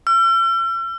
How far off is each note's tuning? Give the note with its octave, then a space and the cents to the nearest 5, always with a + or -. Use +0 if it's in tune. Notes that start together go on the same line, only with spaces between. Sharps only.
E6 +45